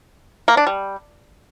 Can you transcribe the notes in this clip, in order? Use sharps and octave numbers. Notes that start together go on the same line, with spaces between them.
A#3
D4
G3